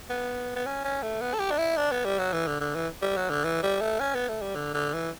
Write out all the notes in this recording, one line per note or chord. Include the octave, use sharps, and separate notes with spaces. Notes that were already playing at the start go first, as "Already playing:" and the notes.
B3
B3
C#4
C#4
A3
B3
A4
G4
D4
E4
D4
B3
G3
F#3
E3
D3
D3
E3
G3
F#3
D3
E3
G3
A3
C#4
B3
A3
G3
D3
D3
E3